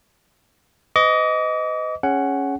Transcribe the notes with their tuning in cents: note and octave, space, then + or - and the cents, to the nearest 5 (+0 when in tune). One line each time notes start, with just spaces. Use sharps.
B4 +45 D#5 +5 D6 -40
C#4 +0 G#4 +0 F#5 +10